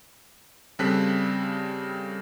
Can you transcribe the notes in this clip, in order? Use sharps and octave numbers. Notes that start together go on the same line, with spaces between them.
C#3 G3 C4 A4 F#6 B6